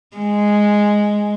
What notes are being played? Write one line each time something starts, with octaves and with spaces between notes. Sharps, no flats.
G#3